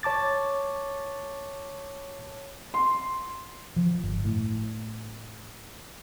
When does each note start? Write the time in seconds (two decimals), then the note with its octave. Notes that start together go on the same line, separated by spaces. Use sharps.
0.03 C#5 A5 D6 A6
2.74 C6
3.76 F3
4.04 G1
4.25 A2